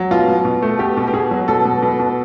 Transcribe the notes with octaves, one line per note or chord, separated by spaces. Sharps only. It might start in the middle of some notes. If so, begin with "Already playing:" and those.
Already playing: F#3
B2 F4
B2
B2
A3
B2 G4
B2
G4
B2 G#4
F#3
B2 A4
B2
B2
B2